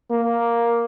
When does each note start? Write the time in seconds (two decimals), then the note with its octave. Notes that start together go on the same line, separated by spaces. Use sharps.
0.11 A#3